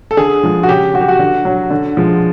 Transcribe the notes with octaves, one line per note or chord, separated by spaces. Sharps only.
A4
D3 G#4
F3 G#3
F#4
C#3 G4
F#3 F#4
G4
F#4
D3
F#3
D3
F3 G#3